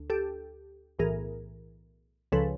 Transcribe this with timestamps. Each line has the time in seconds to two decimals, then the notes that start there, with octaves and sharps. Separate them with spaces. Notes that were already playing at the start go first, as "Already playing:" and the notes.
Already playing: D2
0.10 G4 A4
0.99 B1 A2 E3 G#4 A#4
2.32 C#2 C#3 F3 A4 B4